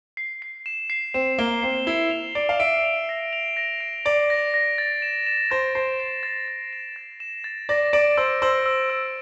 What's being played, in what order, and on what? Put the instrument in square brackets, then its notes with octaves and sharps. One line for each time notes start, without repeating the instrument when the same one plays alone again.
[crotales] C7
C7
E7
C7
[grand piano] C4 [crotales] E7
[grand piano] A#3 [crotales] G7
[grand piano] C4 [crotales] C7
[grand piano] E4 [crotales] F7
[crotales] F7
[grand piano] D5 [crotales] D7
[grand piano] F5
[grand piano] E5 [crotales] D7
[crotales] F7
A#6
F7
A#6
D7
[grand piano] D5 [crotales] D7
[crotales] A#6
A#6
A6
E7
E7
[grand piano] C5 [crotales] A6
[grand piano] C5 [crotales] C7
[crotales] C7
A6
A6
E7
A6
E7
A6
[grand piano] D5 [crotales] A#6
[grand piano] D5 [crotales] D7
[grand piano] C5 [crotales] E6
[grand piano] C5 [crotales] E6
[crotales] E6
E6